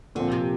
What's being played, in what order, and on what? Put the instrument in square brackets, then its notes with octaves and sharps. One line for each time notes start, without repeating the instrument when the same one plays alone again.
[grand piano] A#2 F3 C4 [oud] D3
[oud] C3